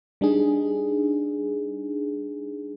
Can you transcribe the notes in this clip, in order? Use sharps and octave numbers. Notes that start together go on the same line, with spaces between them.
G3 D4 D#4 G#4